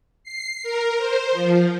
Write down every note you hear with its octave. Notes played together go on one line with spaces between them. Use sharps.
C7
A#4
C5
F3